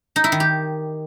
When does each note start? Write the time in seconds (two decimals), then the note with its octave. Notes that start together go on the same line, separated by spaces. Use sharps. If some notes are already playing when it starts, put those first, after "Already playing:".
0.16 D#4
0.24 E4
0.32 D#3
0.40 G4